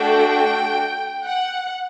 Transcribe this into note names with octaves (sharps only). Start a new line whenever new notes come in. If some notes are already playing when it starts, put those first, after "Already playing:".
Already playing: A3 D4 F#4 A4 G5
F#5